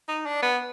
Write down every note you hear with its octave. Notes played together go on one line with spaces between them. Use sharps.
D#4
D4
B3